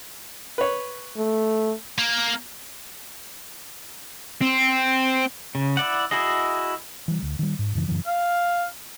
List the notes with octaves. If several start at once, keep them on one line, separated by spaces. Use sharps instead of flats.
B4 C#5
A3
A#3
C4
C#3
E4 D5 F#5
E4 F#4 G#4 D#5
E3 G3
D2
D#3 G3
G#2
F#2 C#3 E3
F#2 C#3 E3 F#3
F5